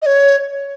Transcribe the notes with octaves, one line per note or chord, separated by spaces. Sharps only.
D#5
C#5